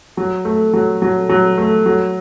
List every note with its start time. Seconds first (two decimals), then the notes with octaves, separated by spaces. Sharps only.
0.17 F#3
0.45 A3
0.73 F#3
1.02 F#3
1.29 F#3
1.57 A3
1.86 F#3